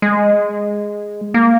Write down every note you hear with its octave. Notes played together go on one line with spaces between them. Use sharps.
G#3
A#3